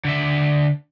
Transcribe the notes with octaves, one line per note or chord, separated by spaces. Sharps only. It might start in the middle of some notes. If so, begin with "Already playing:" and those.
D3 E5